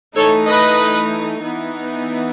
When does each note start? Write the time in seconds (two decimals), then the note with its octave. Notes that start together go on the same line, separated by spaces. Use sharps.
0.16 E3 A3 D#4 A4 C#5
0.47 B4 D#5
1.42 E3 B3 D#4